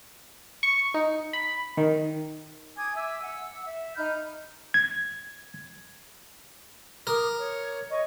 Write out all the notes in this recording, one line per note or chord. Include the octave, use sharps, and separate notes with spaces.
C#6
D#4
B5
D#3
G#5 D6 D#6 G#6
E5 G#5 D6 E6
F#5 E6
E5
D#4 B5 F6 G6
G#6
A#4 D6 D#6
C#5
C#5 D#5 C#6